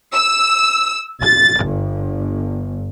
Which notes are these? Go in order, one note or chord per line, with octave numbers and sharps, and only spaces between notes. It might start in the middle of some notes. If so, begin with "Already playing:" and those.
E6
A6
G1